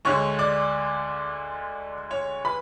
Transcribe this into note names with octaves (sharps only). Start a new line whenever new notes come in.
D2 D3 G#3 C#5 C#6
D5 D6
C#5 C#6
B4 B5